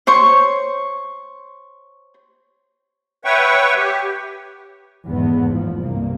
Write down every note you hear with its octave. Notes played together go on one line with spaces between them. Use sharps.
C5 C#5 C#6
B4 C#5 E5 F#5 G5 C#6
G4
F1 E2 G#2 B3
A1 F3
C2 G2 A#3